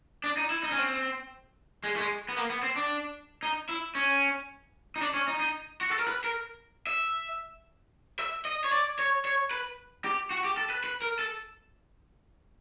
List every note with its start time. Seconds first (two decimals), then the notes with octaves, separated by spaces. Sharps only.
0.24 D4
0.37 D#4
0.50 E4
0.63 D#4
0.72 C#4
0.77 C4
1.84 G#3
1.96 A3
2.00 G#3
2.29 B3
2.36 A#3
2.50 B3
2.63 C4
2.76 D4
3.43 D#4
3.69 E4
3.95 C#4
4.96 D#4
5.02 D4
5.14 C#4
5.28 D#4
5.40 D#4
5.81 F#4
5.91 A4
5.99 A#4
6.08 B4
6.24 A#4
6.87 E5
8.19 E5
8.45 D#5
8.64 C#5
8.72 D5
8.99 C#5
9.25 C#5
9.51 B4
10.04 G4
10.31 F#4
10.44 G4
10.57 A4
10.70 B4
10.84 B4
11.02 A#4
11.19 A4